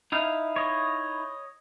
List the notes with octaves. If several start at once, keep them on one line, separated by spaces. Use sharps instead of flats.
D#4 E4 F5
C#5 D#5